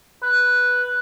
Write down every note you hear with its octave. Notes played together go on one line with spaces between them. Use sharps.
B4